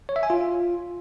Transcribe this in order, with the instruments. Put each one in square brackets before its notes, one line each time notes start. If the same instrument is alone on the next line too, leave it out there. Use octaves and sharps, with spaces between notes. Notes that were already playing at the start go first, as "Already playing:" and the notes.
[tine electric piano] C#5
E5
G#5
F4